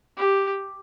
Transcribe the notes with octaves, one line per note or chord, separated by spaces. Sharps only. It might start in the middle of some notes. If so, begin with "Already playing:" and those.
G4